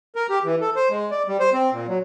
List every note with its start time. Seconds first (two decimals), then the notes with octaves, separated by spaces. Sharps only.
0.16 A#4
0.30 G4
0.44 E3
0.61 A4
0.76 C5
0.90 G#3
1.11 D5
1.28 G3
1.40 C5
1.53 C4
1.72 A#2
1.88 F#3